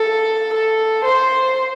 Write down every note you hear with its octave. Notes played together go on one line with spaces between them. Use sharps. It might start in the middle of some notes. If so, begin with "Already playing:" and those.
Already playing: A4
A4
C5